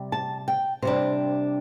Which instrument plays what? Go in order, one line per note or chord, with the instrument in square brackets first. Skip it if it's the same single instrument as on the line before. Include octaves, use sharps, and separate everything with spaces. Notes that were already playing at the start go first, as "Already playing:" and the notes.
Already playing: [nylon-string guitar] C3 G3
A5
G5
C3 G3 D4 C5